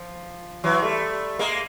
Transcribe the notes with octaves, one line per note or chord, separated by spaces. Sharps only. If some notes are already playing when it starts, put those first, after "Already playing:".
Already playing: F3
E3 F#3
G3 A3
G#3 A#3